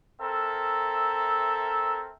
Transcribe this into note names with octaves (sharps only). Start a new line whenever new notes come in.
C4 A4 A#4 E5